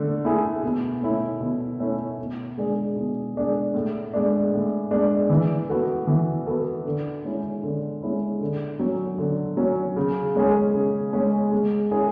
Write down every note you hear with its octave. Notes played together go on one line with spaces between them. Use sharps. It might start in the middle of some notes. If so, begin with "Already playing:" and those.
Already playing: D3 A3
A3 E4 G#4
B2
A3 C#4 E4
B2
A3 C#4 E4
B2
G#3 D4 G#4
B2
G#3 D4 G#4
A2
G#3 D4
A2
G#3 D4
E3
B3 F#4 A4
E3
B3 F#4 A4
D3
G#3 C#4 E4
D3
G#3 C#4 E4
D3
F#3 C#4
D3
F#3 C#4
C#3
G#3 C#4 G#4
C#3
G#3 C#4 G#4
G#3
C#4 E4 G#4